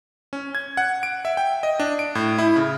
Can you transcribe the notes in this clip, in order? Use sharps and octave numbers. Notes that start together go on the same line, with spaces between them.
C#4
G#6
F#5
D7
E5
G5
D#5
D4
D7
A2
E4
C#3